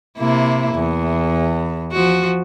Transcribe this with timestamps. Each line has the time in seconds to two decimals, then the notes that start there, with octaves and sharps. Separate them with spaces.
0.18 C3 A#3 E4
0.74 E2
1.92 F3 F#4